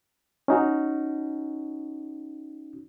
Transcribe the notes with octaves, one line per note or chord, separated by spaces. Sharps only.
C#4 D#4 F#4